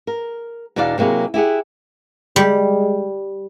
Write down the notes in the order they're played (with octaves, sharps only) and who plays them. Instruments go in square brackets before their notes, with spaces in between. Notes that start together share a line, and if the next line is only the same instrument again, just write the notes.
[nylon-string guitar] A#4
E2 B2 D4 D#4 D5 F5
C3 F#3 A#3 E4 G#4
E4 G4 G#4 F#5
[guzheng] G3 [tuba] G#3